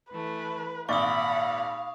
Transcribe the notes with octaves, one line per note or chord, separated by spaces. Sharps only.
E3 A3 B4
G#1 A#2 D5 F5 F#5 B5 C#6 D#6